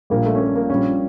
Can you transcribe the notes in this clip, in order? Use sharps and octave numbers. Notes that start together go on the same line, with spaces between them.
A#1 A#2 G3 A#3
A3
C#4
A#3
A#3
A#1 A#2 G3 C#4